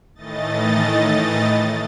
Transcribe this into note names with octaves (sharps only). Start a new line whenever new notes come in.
A2 D#3 E3 A3 D#5 A6